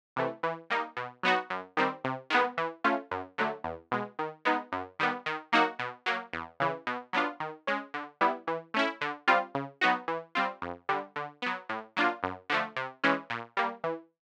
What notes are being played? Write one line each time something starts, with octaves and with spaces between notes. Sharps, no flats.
C3 E3 A3
E3
G3 A#3 D#4
B2
F#3 B3 D#4 F#4
F#2
D#3 G3 C4
C3
D#3 G#3 B3
E3
A3 C#4 F4
F#2
D3 F#3 A3
E2
B2 G#3
D#3
G#3 B3 D#4
F#2
D#3 G3 B3
D#3
F#3 A#3 D#4 F#4
B2
F#3 A#3
E2
C#3 E3
B2
F#3 B3 D4 F4
D#3
G#3 C#4
D3
G3 B3 E4
E3
A3 C#4 E4
D3
G3 C4 F4
C#3
F#3 B3 D#4 F#4
E3
G3 C4 F4
F2
D3 G3
D3
F#3 B3
A2
F#3 A#3 D4 F4
F#2
D3 F3 A3
C3
E3 G#3 C#4
A#2
G3 A#3
E3